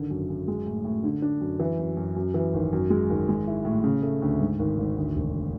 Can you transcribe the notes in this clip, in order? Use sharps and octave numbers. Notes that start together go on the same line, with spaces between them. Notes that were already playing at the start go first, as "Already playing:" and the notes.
Already playing: G#1 D3
F#2
F#2
G#3
A2
A2
D3
D4
F#2
E3
F#2
F#2
F#2
E3
G#1
F#2
G#3
G#1
G#3
E4
A2
C#3
A3
D2
G#2
G#1
G#1
D2
E1